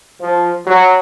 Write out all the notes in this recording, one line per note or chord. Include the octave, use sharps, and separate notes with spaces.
F3
F#3